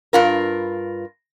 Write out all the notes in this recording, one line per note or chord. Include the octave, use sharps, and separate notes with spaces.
G2 F4 A#4